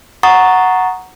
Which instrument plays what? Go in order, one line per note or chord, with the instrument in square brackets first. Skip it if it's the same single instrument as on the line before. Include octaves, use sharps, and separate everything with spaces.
[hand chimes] F#5 A#5 C#6 D#6 A6